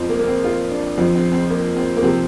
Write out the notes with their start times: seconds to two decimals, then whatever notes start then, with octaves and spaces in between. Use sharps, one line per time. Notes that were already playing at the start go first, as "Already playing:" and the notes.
Already playing: F2 F3 C4
0.09 A#3
0.19 A#3
0.27 C4
0.44 F4
0.71 D4
0.98 F2 F3 C4
1.15 C4
1.32 C4
1.50 A#3
1.77 C4
1.96 A#3
2.03 C3 F3 C4